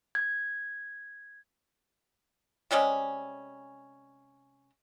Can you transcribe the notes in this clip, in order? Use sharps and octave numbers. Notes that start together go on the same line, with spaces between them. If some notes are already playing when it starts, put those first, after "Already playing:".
G#6
C3 G3 G#3 C#4